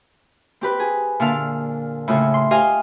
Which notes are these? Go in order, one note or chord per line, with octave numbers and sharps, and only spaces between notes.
C4 G4 B4
G#4
A#2 D3 F5
A2 C#3 F4
C6
G4 C5 D#5 F5 G#5